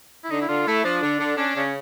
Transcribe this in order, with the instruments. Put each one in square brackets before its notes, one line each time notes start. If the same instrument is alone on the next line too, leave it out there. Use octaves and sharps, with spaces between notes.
[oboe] E4
[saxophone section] D3 [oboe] D#4
[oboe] E4
[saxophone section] D3 [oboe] F4
[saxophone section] A3 [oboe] E4
[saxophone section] F3 [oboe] D4
[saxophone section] D3
D3
[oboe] C#4 [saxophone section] D4
[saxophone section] C#3 [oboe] C#4